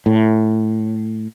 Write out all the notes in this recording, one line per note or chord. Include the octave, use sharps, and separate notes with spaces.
A2